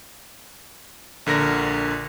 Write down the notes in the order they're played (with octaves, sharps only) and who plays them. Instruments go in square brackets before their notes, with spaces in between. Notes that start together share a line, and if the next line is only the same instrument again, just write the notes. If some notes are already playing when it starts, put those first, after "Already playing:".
[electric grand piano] A#1 D3 A#4 A#6